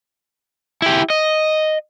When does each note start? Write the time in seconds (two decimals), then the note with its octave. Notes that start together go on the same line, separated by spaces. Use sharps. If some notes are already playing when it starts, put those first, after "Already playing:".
0.82 E4 G4
1.10 D#5